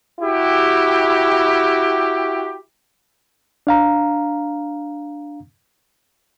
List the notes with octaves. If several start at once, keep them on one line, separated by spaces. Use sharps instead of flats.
E4 F#4 G4
D4 F5 A#5